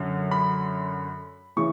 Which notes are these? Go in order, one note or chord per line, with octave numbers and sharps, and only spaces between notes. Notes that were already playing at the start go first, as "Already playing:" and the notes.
Already playing: F#2 D3
B5
C#3 E3 C#6